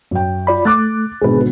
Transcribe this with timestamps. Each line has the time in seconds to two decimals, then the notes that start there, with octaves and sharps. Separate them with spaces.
0.11 F#2 G5
0.47 F4 D5 B5
0.65 A3 D6 F#6 A6
1.22 G#1 B2 D3 G#4 B4